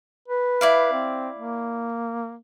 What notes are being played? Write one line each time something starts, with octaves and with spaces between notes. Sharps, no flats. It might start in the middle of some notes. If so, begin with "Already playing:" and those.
B4
E4 D5 F5
C4
A#3